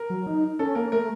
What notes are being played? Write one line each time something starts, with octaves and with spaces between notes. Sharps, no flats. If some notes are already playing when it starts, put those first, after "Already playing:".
Already playing: A#4
F#3
D#4
C#4 A4
A#3 A#4
A3 A#4